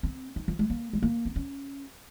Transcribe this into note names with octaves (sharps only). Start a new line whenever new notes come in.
C4
D#4
F3
G#3
A#3
G#3
A#3
C4
C#4